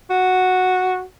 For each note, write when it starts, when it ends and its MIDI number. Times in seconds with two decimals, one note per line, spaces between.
0.10 1.01 66